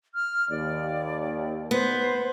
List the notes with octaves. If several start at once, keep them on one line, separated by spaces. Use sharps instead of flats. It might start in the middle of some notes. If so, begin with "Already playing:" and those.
F6
D#2 D5
B3 C5